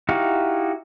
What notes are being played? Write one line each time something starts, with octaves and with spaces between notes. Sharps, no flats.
D#4 E4 F#4 G4 F5